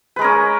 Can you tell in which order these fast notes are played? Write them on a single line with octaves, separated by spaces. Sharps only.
B4 G#3 A#4 C#4